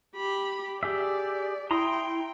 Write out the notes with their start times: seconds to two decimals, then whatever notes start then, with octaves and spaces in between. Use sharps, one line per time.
0.16 G4 B5
0.83 G4 G#4 D5 E5
1.71 E4 G5 A#5 C6 D#6